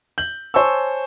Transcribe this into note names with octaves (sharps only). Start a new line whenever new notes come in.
G6 F#7
C5 C#5 G#5 A5 C#6 E6